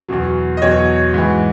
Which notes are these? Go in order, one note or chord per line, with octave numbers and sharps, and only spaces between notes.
E2 B2 F#3
D#5
E2 B2 F#3 C#5
G#2 E3